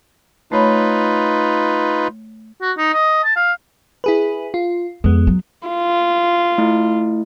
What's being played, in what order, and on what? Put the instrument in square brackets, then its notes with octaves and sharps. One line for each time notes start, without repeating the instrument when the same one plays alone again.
[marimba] A3 C#5 B5 [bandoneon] D#4 F4 B4
[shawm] F#4
D#4
D#5
A5
F5
[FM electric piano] E4 G#4 B4
F4
[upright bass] F2 [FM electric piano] G#3 B3
[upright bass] F#3
[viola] F4
[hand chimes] A3 E4